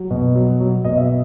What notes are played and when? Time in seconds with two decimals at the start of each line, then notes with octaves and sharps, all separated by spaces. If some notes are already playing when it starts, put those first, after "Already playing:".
Already playing: F#3
0.10 B2
0.35 F#3
0.60 F#3
0.84 B2 D#5
0.97 E5